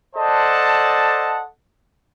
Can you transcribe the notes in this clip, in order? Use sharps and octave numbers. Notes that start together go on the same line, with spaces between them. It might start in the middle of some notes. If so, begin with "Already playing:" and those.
A4 C5 D5 D#5 F#5 A5